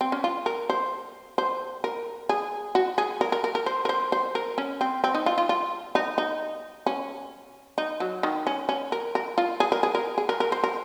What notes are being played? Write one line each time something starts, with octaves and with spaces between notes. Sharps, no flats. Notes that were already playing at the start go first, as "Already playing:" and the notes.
C4
C#4
F4
A#4
C5
C5
A#4
G#4
F#4
G#4
A#4
A#4
A#4
A#4
C5
A#4
C5
C5
A#4
C#4
C4
C4
D#4
F4
F4
F4
D#4
D#4
C#4
D#4
F#3
D#3
C#4
C#4
A#4
A#4
F4
G#4
A#4
G#4
A#4
G#4
A#4
A#4
C5
A#4